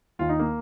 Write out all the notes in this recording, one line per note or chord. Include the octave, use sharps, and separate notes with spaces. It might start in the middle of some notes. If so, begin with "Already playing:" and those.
D#2 D#3 F4
D#4
A#3